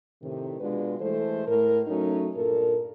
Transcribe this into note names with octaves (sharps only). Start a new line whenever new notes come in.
A2 C3 D#3
B2 G#3 D4 F4 F#4 B4
E3 G#3 A3 A4 C5
A2 A#4
F#3 A3 C#4 D#4
G2 A#2 A4 A#4